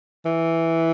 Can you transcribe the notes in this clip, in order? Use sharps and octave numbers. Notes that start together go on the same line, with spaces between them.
E3